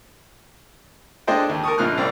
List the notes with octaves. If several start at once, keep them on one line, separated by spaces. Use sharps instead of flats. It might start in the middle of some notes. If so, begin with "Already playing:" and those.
G#3 D4 A4 C5 D#5 G5
D#2
A#4 A5 C#6 D#6
A#1 F2 G#2 F4 F6 F#6
C2 C4 D5